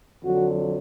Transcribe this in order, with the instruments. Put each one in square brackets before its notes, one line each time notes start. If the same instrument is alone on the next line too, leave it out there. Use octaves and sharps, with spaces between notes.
[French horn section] F2 D3 F#3 F#4